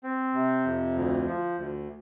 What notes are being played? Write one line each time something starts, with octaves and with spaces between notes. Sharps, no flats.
C4
C3
F2
D2
F3
D2